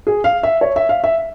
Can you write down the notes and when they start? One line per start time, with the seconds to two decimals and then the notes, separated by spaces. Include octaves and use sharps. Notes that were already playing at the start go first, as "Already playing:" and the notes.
0.07 G#4
0.24 F5
0.43 E5
0.61 C#5
0.76 E5
0.89 F5
1.04 E5